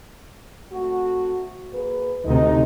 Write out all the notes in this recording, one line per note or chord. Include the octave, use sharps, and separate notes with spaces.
A3 C4 F#4
A#3 G#4 B4
D2 C3 D#4